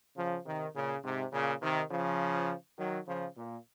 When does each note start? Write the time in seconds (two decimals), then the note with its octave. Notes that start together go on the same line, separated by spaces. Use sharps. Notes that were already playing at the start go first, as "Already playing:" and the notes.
0.17 C#3 F3
0.46 C3 D#3
0.75 A#2 C#3
1.04 G#2 C3
1.33 A#2 C#3
1.62 C3 D#3
1.91 C#3 F3
2.78 D#3 F#3
3.07 C#3 F3
3.36 A#2